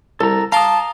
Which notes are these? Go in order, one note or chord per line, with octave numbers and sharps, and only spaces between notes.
C2 A4 A#5
F5 A5 A#5 C6 D6 D#6